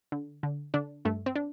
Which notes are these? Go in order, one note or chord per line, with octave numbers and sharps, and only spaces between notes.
D3
D3
D3 D4
G2 A3
C4
D4